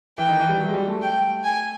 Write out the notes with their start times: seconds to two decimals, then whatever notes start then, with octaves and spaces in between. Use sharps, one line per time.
0.18 E3 G5
0.29 D#3
0.39 E3
0.49 G3
0.60 F#3
0.68 G#3
0.74 G3
0.88 A3
1.02 G5
1.44 G#5